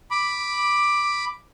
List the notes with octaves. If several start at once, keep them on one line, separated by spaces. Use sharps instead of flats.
B5 D6